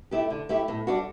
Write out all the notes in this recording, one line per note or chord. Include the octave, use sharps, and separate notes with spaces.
A3 E4 G4
D3
A3 E4 G4
A2
G3 D4 F#4